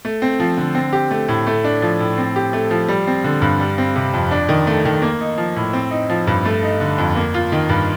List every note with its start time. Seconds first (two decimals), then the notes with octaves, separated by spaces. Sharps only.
0.05 A3
0.22 C4
0.40 F3
0.57 D3
0.75 C4
0.93 G4
1.11 A3
1.28 A2
1.47 A3
1.64 D4
1.82 F3
2.00 A2
2.18 C4
2.36 G4
2.53 A3
2.71 F3
2.88 G3
3.07 C4
3.24 D3
3.42 G2
3.60 G3
3.78 C4
3.96 C3
4.13 F2
4.31 D4
4.49 D#3
4.67 A3
4.85 D#3
5.02 A#3
5.21 D#4
5.38 F3
5.56 A2
5.73 C4
5.91 D#4
6.10 F3
6.27 G2
6.45 A3
6.63 D#4
6.80 D3
6.98 F2
7.16 A#3
7.34 F4
7.52 D#3
7.69 G2